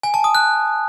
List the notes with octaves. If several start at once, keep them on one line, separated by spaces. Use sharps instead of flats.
G#5
A5
D#6
F#6